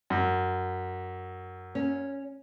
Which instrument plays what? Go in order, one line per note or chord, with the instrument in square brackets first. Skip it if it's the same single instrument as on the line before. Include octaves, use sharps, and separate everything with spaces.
[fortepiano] F#2
[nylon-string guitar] C#4